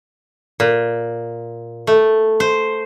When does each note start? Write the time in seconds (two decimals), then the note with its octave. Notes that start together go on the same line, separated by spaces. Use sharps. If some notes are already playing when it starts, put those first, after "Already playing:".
0.60 A#2
1.87 A3
2.40 C5